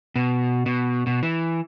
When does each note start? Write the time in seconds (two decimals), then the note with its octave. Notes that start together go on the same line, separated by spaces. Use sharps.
0.16 B2
0.66 B2
1.07 B2
1.23 E3